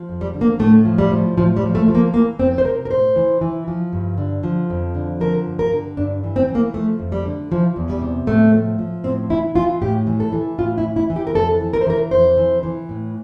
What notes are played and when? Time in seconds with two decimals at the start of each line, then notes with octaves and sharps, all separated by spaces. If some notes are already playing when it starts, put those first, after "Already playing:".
Already playing: F3
0.09 F2
0.21 G3
0.34 D3
0.41 A#3
0.59 A2 A3
0.85 F3
0.98 G3
1.11 F3
1.37 A2 F3
1.56 G3
1.62 F3
1.75 A3
1.88 F3
1.95 A#3
2.13 E3 A#3
2.39 F2 C4
2.58 C5
2.65 C3 A#4
2.85 A#4
2.91 A2 C5
3.16 E3
3.41 E3
3.68 F3
3.93 G2
4.18 D3
4.43 F3
4.70 F2
4.95 D3
5.21 F3 A#4
5.46 G2
5.59 A#4
5.72 D3
5.97 G2 D4
6.24 E3
6.36 C4
6.49 E3
6.55 A#3
6.74 F3 A3
7.00 F2
7.12 G3
7.25 D3
7.51 E3 F3
7.76 E2
7.90 G3
8.02 C3
8.27 A2 A3
8.53 F3
8.79 F3
9.04 A2 C4
9.30 E3 E4
9.55 E3 F4
9.82 A2 G4
10.07 E3
10.20 A4
10.32 E3
10.59 A2 F4
10.78 E4
10.84 E3
10.96 E4
11.10 E3
11.16 G4
11.27 A#4
11.35 F2 A4
11.61 E3
11.73 A#4
11.81 C5
11.87 E3 A#4
12.11 F2 C5
12.37 E3
12.63 E3
12.89 A2